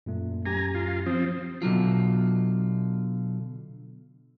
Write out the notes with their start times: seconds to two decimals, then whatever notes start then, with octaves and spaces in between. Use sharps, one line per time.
0.06 F#2 A#2 A3
0.46 F#2 G4 G#5 A#5
0.75 F4
1.06 F3 C4 D#6
1.62 B2 D3 F#3 F4